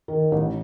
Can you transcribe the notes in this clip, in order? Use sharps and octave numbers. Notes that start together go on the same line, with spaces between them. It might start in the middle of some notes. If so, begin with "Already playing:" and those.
D#3
A1